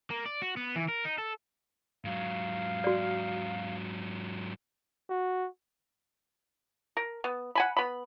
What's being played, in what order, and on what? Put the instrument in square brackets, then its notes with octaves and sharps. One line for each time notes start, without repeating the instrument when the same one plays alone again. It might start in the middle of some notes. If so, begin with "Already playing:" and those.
[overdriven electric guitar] A#3
D5
F#4
B3
E3
A#4
D#4
A4
[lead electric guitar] G#2 F#3 [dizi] F5
[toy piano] F#4 D5
[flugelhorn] F#4
[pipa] A#4
B3
F#5 G#5 B5
B3 B5